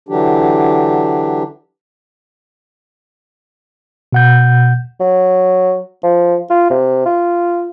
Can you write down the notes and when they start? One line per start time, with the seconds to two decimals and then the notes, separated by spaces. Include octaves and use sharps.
0.09 D3 E3 F#3 D4 G4
4.13 B2 F#5 G6
5.00 F#3
6.04 F3
6.50 F4
6.70 C3
7.06 F4